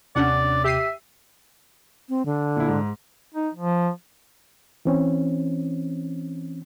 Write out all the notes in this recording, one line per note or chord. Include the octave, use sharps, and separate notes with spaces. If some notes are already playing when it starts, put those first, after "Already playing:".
D#2 C3 C#4 D4 D5 F#5
G4 E5 C7 D#7
C4
D3
A#2 E4
G#2
D#4
F3
E3 C4 C#4